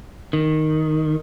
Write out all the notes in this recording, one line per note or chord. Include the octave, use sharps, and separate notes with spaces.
D#3